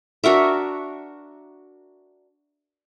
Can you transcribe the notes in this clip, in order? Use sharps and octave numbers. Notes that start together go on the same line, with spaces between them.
D4 F#4 A#4 E5